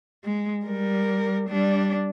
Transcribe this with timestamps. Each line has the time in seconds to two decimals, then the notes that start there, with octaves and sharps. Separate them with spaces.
0.24 G#3
0.65 G3 A#4
1.49 G3 D4